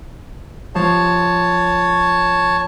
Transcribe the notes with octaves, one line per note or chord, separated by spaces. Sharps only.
F3 C#5 A5